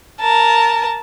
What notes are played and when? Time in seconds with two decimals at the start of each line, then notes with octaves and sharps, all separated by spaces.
0.20 A#4 A5